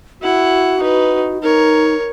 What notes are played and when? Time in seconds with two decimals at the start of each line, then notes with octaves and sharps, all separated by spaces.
0.22 E4 F#4 F#5
0.80 D#4 B4
1.42 D#4 A#4 C#5